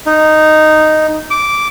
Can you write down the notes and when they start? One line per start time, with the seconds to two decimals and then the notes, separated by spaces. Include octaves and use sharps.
0.06 D#4
1.30 D6